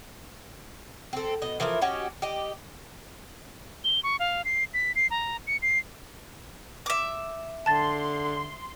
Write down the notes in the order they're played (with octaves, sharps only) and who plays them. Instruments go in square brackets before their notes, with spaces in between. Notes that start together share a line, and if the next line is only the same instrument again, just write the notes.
[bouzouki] C4 A4
B2 D#5
E3 F3 A3 A#4
C#4 F#4 G4 D#5
G4 D#5
[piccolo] G7
C#6
F5
C7
B6
C7
A#5
C#7
C7
[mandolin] E5 D6
[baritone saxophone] D3 [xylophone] A5 A6 [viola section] C6